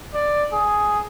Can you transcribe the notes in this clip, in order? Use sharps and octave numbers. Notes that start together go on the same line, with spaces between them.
D5
G#4